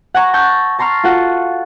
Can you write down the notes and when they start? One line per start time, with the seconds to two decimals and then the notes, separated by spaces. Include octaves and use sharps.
0.14 F#5 G#5 A#5 C#6
0.33 A5 C#6 E6 G6 G#6 A#6
0.79 A5 A#5 C6 C#6 F6
1.04 F4 F#4 A4 F#5